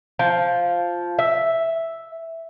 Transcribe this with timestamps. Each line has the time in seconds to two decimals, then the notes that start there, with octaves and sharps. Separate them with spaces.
0.19 F3
1.19 E5